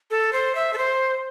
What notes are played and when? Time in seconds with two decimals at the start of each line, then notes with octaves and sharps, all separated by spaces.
0.11 A4
0.33 C5
0.55 E5
0.73 A4
0.78 C5